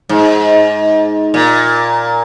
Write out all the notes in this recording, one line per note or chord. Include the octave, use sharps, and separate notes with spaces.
G#2
A#2